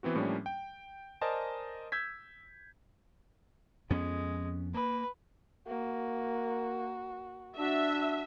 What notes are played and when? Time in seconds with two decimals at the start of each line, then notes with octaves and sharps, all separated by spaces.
0.03 E3 B3 C4 F#4
0.15 A2 F3 G3 A#3 C#4 D4
0.46 G5
1.21 A#4 C5 D5 D#5 G#5 A5
1.92 E6 G6 G#6 B6
3.90 F2 G#3 B3 C#4
4.74 A#3 B4
5.67 A#3 F#4
7.58 D4 F#4 E5